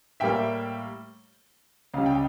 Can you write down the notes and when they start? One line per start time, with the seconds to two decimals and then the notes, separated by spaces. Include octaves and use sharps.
0.20 A2 G3 A#3 E5 G5
1.94 C#2 C#3 G3 F5
2.06 G5